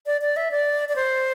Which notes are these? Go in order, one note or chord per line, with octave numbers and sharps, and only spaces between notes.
D5
D5
E5
D5
D5
C5